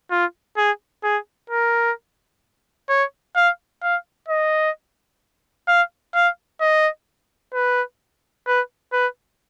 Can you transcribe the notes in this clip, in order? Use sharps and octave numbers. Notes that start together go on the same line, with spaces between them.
F4
G#4
G#4
A#4
C#5
F5
F5
D#5
F5
F5
D#5
B4
B4
B4